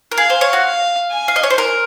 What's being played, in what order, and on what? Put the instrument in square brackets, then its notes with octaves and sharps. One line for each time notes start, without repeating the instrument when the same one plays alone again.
[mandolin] A#4
[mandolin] G#4 [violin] F5
[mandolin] C5
C#5
F#4
[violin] F5
G#5
[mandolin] F5
D#5
C#5
C5
A#4